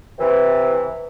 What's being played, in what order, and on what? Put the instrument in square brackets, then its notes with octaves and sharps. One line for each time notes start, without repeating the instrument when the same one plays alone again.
[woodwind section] C3 E3